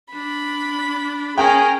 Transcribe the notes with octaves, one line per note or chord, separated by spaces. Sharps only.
D4 B5
C#4 G#4 A#4 G5